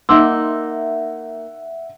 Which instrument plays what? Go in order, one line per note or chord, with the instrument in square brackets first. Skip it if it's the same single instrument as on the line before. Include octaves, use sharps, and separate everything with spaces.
[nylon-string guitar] A#3 D#4 [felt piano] E5 F#5 [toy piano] C6 D6 E6